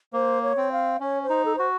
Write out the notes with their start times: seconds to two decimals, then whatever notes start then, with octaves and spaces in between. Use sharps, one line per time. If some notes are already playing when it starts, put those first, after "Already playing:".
0.13 A#3 C5
0.42 C#5
0.57 C4
0.72 F5
1.00 C#4 C#5
1.23 C5
1.30 D#4
1.45 A4
1.56 F#4 C5